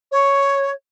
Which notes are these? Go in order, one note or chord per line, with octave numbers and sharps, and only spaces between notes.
C#5